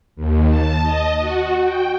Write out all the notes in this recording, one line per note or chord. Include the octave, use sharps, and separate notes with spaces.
D#2
A5
D#5
F#4
G5